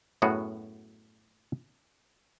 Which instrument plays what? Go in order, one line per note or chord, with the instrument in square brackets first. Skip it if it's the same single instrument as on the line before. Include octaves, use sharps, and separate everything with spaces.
[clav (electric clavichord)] F#2 A2 B3 F#4 G#4